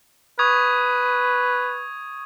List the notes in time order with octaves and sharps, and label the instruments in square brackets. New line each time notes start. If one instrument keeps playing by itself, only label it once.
[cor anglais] B4 [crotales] C#6 D#6 G#6